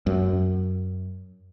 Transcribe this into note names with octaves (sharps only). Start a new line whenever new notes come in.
F#2